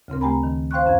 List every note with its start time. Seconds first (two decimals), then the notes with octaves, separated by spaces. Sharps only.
0.08 D2 C#3 C4 A#4
0.21 A3 G4 G5 G#5 A#5 B5
0.43 D#3
0.71 C5 F5 G5 C6 C#6 F#6
0.86 F#2 C#4 F5 G#6